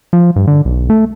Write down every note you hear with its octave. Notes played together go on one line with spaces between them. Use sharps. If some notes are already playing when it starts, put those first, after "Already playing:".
F3
G2
D3
B1
A3